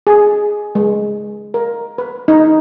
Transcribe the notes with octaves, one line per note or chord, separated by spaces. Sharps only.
G#4
G#3
A#4
B4
D#4